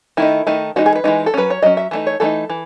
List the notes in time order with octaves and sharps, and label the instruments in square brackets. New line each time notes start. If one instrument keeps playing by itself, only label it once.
[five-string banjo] D#3 A3 D#4 E4
D#3 A3 D#4
E3 G#3 D#4 F#4
G#4
B4
E3 G#3 D#4
A4
F#3 C#4 B4
C#5
F#3 C#4 D#5
E5
E3 A3 D#4
C#5
E3 A3 D#4 A4
E3